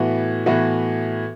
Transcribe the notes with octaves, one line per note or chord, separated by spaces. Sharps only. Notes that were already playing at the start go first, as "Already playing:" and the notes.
Already playing: A2 E3 B3 F#4
A2 E3 B3 F#4